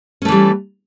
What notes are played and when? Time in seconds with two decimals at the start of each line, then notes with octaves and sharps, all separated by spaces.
0.22 C#4
0.25 A3
0.28 E3
0.32 G3